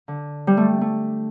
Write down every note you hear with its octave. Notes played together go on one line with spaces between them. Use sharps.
D3
G3
A3
A3